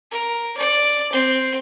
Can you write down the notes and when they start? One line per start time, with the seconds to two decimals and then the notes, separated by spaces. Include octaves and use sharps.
0.11 A#4
0.57 D5
1.12 C4